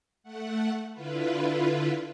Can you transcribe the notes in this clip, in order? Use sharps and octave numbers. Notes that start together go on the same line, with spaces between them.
A3 F#5
D3 E4 F4 B4